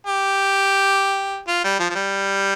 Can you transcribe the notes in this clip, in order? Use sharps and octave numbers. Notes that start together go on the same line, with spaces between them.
G4
F4
G3
F3
F3
G3